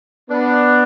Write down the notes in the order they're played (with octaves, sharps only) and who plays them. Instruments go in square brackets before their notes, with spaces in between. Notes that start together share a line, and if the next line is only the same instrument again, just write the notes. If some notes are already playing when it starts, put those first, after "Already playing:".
[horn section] B3 D4